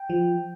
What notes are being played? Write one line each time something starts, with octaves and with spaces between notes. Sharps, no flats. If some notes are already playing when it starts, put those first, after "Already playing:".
Already playing: G5
F3